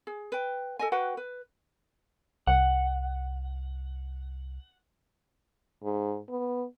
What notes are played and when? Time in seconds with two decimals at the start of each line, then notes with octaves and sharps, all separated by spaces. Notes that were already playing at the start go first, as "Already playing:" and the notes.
0.07 G#4
0.32 B4 G5
0.79 A4 D#5 G#5
0.92 F#4 B4 F#5 G5
1.17 B4
2.47 C2 F#5
5.83 G#2
6.29 B3